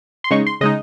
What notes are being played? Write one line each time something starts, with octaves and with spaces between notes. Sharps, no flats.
C6
C#3 G#3 D#4 C#6
C6
C#3 G#3 D#4 D#5